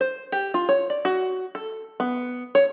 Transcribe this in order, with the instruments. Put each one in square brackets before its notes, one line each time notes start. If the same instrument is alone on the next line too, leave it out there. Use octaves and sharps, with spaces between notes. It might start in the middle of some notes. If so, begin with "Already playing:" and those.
[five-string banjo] C5
G4
F4
C#5
D5
F#4
A4
B3
C#5